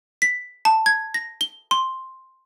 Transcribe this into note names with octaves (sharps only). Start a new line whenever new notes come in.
B6
A5
G#6
A#6
G7
C6